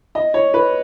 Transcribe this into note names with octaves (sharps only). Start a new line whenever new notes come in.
D#5
C#5
B4